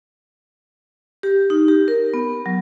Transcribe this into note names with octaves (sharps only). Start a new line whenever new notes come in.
G4
D#4
G4
A#4
B3
F#3